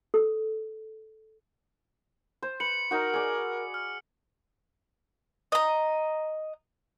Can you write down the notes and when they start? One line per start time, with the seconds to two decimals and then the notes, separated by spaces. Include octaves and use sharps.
0.14 A4
2.43 C5
2.60 B4 C#7 F#7
2.91 D#4 F#4 A#4
3.14 G#4 D5
3.74 F6
5.52 D#5 A#5